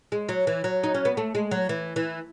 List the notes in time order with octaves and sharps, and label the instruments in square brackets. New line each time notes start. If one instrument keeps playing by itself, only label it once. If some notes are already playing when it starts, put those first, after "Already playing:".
[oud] G#3
F#3
E3
F#3
D#4
C#4
B3
A3
G#3
F#3
E3
E3